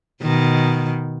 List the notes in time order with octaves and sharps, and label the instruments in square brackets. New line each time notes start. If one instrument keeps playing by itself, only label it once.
[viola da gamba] B2 D#3